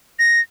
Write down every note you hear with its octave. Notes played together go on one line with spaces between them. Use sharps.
A#6